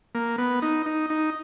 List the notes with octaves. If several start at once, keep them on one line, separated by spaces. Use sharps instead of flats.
A#3
B3
D#4
D#4
D#4